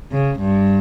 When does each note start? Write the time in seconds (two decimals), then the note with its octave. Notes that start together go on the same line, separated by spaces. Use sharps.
0.11 C#3
0.40 G2